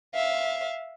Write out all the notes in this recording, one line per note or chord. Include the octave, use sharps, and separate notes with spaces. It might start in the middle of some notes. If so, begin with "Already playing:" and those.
E5 F5